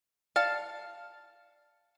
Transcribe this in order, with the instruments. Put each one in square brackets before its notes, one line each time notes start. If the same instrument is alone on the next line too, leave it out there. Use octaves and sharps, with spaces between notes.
[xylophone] D5 F6 C#7 [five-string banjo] F5 A5